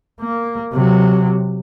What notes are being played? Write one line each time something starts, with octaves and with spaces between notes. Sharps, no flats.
A#3
C3 F#3